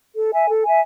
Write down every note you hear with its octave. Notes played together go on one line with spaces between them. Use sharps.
A4
E5 G#5
A4
E5 G#5